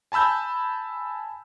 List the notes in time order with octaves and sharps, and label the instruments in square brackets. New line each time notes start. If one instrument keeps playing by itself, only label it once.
[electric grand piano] G#5 A5 B5 E6 G6